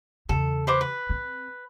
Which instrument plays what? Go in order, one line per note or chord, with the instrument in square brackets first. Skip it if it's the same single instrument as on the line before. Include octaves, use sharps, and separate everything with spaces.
[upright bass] E2 C#3 [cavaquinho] A4
[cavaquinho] B4 C5 D6
B4
[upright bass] C4